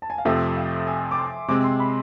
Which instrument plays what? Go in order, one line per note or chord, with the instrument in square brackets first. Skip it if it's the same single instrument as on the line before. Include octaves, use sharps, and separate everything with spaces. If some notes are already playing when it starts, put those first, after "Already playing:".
[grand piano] A5
G#5
F5
[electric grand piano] F2 C3 F3 A3 C4 [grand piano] E5
[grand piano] F5
G#5
D6
C6
[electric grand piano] C3 G#3 C4 [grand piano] D6
[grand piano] C6
B5